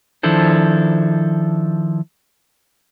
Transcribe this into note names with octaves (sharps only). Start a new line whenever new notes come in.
D#3 F3 D4 E4 A4 C5